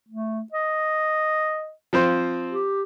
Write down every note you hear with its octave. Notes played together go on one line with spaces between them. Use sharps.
A3
D#5
F3 C4 C5
G4